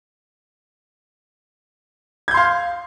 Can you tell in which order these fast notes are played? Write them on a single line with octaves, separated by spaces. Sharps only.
G#6 G6 C6 F5